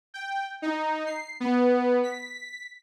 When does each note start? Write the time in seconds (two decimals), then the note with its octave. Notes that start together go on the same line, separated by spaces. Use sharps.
0.14 G5
0.62 D#4
1.06 C7
1.40 B3
2.03 B6